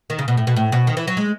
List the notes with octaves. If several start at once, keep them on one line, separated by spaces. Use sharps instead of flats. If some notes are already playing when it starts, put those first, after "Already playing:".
D#3
C#3
B2
A2
B2
A2
B2
D#3
E3
F#3
G#3